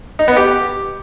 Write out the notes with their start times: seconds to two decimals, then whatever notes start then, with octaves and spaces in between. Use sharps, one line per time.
0.19 D#4
0.28 B3
0.37 G4